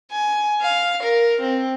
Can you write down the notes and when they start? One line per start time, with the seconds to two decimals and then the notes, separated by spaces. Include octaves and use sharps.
0.12 G#5
0.62 F5
1.03 A#4
1.41 C4